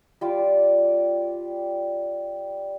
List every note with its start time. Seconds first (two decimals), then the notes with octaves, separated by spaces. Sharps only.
0.21 G3 F4 D5